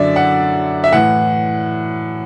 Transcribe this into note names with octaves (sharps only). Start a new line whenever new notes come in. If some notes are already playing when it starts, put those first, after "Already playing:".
Already playing: F#2 D3 D5 E5
F#5
E5
A2 E3 F#5